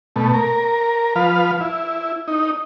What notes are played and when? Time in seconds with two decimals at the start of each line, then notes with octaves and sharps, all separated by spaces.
0.16 B2 A3
0.34 A#4
1.16 F3 B4 F5
1.60 E4
2.28 D#4